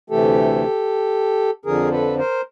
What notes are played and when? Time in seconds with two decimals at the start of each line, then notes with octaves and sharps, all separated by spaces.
0.10 D2 C3 E3 A3 G4 A4
1.65 F2 D3 F3 G#4 A#4
1.92 A4 B4
2.18 A#4 C5